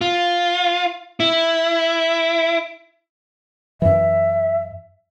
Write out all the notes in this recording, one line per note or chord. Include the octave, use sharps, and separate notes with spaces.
F4
E4
F#2 E3 E5